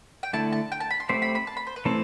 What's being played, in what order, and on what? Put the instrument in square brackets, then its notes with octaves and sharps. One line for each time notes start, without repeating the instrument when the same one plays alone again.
[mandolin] G5
[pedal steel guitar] D3 A3 E4 [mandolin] A5
[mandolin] A5
G5
A5
B5
C6
[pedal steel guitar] A3 C4 G4 C5 [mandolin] B5
[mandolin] B5
B5
A5
B5
C5
B4
[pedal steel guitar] E3 A3 C4 [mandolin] A4